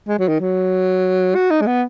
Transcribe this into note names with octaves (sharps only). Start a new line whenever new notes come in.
G#3
F#3
D#3
F#3
F#4
D#4
G#3
B3